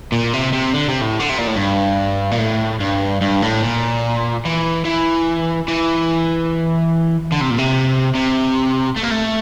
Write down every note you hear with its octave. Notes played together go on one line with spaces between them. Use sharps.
A#2
C3
C3
D3
C3
A2
D3
C3
A#2
A2
G2
A#2
A2
G2
G2
A2
A#2
E3
E3
E3
D3
C3
A#2
C3
C3
A3
A#3
A3